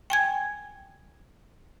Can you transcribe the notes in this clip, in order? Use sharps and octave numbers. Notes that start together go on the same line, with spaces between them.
G5 G#5 G#6